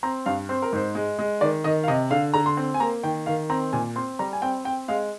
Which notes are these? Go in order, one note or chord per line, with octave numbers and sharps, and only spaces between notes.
C4 A#5
G2 F5
C4 C5
A#4
G#2 C5
G#3
G#3
D#3 D5
D#3 D#5
F5
C3 D#5
D3 F5
D3 A#5
C6
C4
G#5
A#3 A#5
D#3 G5
D#3 F5
C4 A#5
A#2 G#5
C4 C6
G3 A#5
G#5
C4 G5
C4 G5
G#3 F5